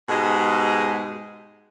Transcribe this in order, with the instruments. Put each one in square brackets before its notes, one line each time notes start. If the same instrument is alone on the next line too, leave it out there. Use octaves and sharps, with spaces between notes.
[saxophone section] G#2 B2 G#3 G4 G#4